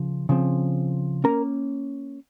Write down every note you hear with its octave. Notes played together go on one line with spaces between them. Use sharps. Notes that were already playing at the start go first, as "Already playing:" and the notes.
Already playing: C#3 F3
C#3 F3 C4
A#3 C#4 A#4 A#5